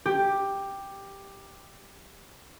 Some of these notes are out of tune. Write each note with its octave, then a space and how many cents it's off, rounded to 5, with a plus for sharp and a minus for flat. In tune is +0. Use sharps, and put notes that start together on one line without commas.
G4 +5